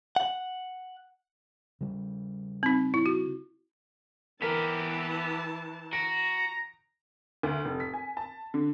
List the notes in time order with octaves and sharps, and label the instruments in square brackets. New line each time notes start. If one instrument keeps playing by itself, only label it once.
[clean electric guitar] F#5
[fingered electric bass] C#3 G3
[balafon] C4 D#4
E4
F#4
[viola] E3 A5 [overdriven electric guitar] B3 G4 [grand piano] A#4 B6
[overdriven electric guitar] F#4 [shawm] A#5 [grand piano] D7
[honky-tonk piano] D2
F1
B6
G#5
A5
D3